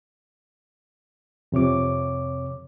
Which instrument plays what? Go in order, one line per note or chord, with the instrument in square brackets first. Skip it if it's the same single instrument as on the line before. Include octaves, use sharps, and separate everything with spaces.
[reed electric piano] F2 C3 C#5 D6